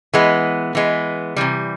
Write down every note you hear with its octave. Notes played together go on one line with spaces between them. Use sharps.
E3 G#3 B3
E3 G#3 B3
C3 E3 G3